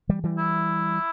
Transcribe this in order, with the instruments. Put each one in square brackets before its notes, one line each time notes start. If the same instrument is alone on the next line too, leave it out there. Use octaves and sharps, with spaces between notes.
[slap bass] E3 G3
E3 G3
[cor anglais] E4